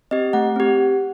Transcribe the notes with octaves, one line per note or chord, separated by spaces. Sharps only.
C4 G4 D#5
A3 F#5
C4 G4